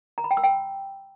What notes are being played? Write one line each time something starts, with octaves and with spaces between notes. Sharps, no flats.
A#5
B5
G5
E6
G5